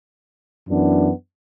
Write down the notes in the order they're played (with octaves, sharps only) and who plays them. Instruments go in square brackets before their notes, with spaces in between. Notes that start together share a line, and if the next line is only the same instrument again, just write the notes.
[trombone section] F#2 E3 B3 D4